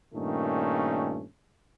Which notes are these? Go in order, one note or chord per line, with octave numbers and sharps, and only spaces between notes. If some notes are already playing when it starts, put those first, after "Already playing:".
G2 A#2 D#3 A3 C#4